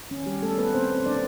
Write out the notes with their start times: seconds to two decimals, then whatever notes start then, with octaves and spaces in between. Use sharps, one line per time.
0.11 D#3 C#4
0.26 G3 G4
0.42 F#3 A3 B3 A4
0.58 B3 B4
0.74 B2 C4 C5
1.06 F#3 A#3 D4 D5